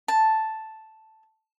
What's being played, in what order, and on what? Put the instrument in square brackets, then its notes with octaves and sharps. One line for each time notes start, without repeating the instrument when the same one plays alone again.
[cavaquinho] A5